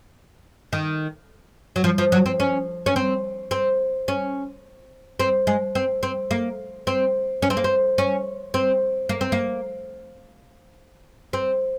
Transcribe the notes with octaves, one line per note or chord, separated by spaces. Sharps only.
D#3
F#3
F3
F3
F#3
C4
C#4
C#4
C4
C4
C#4
C4
G#3
C4
C4
A#3
C4
C#4
C4
A#3
C4
C#4
C4
A#3
C4
A#3
C4